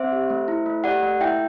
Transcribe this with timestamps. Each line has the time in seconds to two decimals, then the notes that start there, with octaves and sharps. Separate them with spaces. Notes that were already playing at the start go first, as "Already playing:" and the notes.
Already playing: C4 C5 E5
0.12 G4
0.30 A3
0.48 E4
0.66 A3
0.84 G4 D5 F#5
1.02 A3
1.21 E4 E5 G5